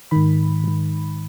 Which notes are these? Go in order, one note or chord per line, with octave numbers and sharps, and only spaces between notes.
G#2 D#3 B5
G#2 D#3